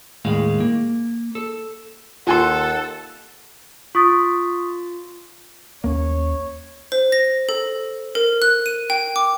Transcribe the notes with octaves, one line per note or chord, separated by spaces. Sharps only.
D#2 A2 G#3 F5
A#3
A4
D#2 F4 A4 F#5 G#5 C6
F4 C#6 D#6 A6
D#2 A#3 C#4 C#5
C5
A#6
A4
A#4
F#6
D#7
G5
D6